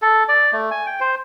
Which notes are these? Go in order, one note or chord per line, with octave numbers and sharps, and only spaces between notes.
A4
D5
A3
G#5
G5
C5